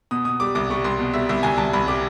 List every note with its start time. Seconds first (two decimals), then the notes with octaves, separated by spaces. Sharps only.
0.11 B2 D#6
0.25 B2 D#6
0.40 G3 D6
0.55 C2 D6
0.71 G3 C#6
0.84 C2 C6
0.99 B2
1.14 G3 E5
1.29 C2 E5
1.43 C2 G#5
1.58 C2 A5
1.74 C2 B5
1.88 G3 D6